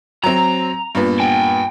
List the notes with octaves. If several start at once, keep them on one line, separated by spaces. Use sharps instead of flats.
F#3 C4 A#5
G2 A#2 B3
G5 G#5